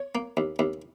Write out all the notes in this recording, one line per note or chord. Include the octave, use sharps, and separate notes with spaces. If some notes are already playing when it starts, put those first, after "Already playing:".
Already playing: C#5
A#3
D#2
D#2